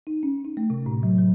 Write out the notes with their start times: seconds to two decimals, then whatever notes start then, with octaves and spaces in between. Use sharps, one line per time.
0.07 D#4
0.23 C#4
0.45 D#4
0.57 A3
0.70 C3
0.86 A2
1.03 F#3
1.18 F#3